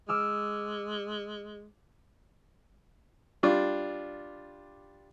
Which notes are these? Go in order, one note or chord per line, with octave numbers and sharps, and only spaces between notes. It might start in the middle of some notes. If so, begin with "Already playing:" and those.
G#3 D6 E6 F6
G3 D4 F4